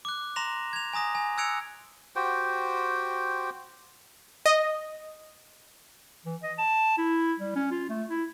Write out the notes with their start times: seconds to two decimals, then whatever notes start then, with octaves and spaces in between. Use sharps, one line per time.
0.05 D6 F#6
0.36 A#5 C6 A#6 E7 F7
0.73 G#6 F7
0.93 G#5 A#5 D#6 A#6
1.15 G#5
1.38 E6 F#6 G#6 C#7 D7 F7
2.16 F#4 G4 C5 G5
4.46 D#5
6.26 E3
6.43 D#5
6.58 A5
6.98 E4
7.39 G3
7.55 C#4
7.71 F4
7.89 A3
8.10 E4